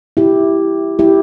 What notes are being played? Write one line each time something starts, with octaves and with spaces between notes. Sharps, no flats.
E4 G4
E4 G4